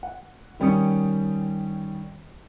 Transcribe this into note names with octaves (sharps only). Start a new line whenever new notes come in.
F#5
D#3 G3 C#4 D#6 C#7